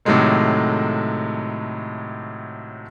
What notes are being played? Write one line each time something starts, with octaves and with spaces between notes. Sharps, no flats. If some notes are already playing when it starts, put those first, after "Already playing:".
A2 C3 D#3 F#3 G#3 A3